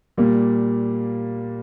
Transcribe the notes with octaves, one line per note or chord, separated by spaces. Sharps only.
A#2 G3 A#3